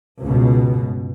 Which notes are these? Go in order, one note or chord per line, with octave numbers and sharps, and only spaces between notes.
C#2 G2 B2